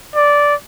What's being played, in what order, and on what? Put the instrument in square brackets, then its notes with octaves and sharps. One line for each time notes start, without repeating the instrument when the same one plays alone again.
[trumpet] D5